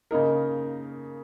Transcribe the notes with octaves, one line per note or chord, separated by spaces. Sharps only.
C#3 A#3 D#4 A#4